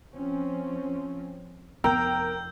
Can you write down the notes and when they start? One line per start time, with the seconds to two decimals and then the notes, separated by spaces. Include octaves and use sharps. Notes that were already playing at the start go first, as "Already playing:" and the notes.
0.12 F3 C4 C#4
1.84 F1 B3 A#4 G5 A#5 E6 G6